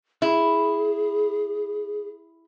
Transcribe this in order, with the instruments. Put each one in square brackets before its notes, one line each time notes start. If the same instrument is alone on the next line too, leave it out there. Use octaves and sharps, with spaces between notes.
[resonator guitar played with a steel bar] E4 [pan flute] G#4